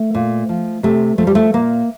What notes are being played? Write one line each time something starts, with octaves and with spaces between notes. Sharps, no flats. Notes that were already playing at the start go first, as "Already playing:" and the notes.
Already playing: A3
A#2
F3
C3 A3
F3 A3
G3
A3
A#2 A#3